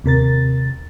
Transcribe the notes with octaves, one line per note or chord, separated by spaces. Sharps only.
D#2 C3 A#4 A6